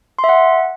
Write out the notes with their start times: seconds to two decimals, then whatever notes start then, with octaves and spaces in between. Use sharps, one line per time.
0.19 C6
0.24 E5
0.29 F#5